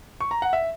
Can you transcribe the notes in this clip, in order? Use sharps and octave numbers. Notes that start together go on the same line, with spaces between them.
C#6
A#5
F#5
E5